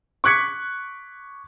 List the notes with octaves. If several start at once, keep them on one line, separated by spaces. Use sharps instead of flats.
C#6 D6 F#6 G#6 B6 C#7